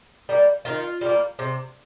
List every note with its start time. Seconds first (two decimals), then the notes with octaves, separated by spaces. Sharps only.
0.29 G3 A#3
0.65 D#3 F4
1.01 G3 A#3
1.39 C3